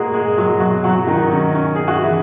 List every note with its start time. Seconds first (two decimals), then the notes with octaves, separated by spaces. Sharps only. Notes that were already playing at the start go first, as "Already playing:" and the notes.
Already playing: A#2 G#3 A#3 F#4 G#4 A#4
0.14 G#3 G#4
0.38 F#3 F#4
0.60 B2 F#3 F#4
0.84 F#3 F#4
1.07 D#3 D#4
1.31 C#4
1.55 C#4
1.76 G#4
1.88 F#4
2.01 E3 E4